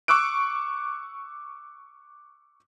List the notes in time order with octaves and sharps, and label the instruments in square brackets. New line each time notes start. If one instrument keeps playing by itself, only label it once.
[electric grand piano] C#6 D6 E6 F#6 D7